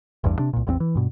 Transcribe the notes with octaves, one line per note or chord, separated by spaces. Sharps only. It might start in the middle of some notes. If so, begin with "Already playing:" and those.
A1 E2 G2
C3 D4
C2 A#2
A1 E2 A#3 C4
E3
G2 B2